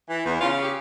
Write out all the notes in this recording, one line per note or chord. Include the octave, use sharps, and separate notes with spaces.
E3
E2
C#3 F4
G4